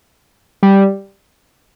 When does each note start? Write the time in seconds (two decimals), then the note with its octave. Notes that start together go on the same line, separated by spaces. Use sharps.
0.63 G3